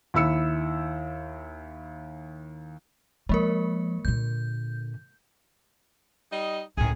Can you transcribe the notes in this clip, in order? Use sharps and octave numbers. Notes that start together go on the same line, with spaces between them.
D#2 E4 E6 C#7
F3 G#3 A#3 A#4
A#2 D3 G6
G3 D#4 D#5
C#2 A2 D#3 G#4